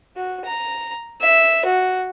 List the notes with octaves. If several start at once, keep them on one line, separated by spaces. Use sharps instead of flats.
F#4
A#5
E5
F#4